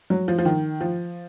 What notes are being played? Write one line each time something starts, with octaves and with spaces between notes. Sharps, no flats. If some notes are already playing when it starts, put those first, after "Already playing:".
F#3
F3
F3
D#3
F3